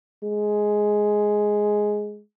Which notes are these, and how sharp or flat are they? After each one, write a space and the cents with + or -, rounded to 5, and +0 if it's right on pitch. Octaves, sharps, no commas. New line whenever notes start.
G#3 +5